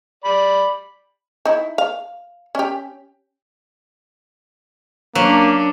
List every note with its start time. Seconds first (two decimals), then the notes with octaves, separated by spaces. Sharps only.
0.24 D5 B5
1.45 D#4 E4
1.78 F5
2.55 C#4 G4
5.15 F#3 A#3 C#4 D4